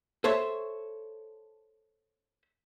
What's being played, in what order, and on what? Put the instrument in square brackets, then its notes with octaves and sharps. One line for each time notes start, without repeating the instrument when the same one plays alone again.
[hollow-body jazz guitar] A4 C5 C#5 E5